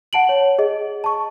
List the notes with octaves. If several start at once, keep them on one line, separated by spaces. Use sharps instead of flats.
F#5 A5 D7 F#7
C#5
G#4 D#5
A5 C#6